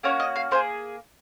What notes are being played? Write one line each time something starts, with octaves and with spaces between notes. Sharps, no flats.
A#3 C#4 F#4 C#5
D#5
F5
A#3 D#4 G#4 C5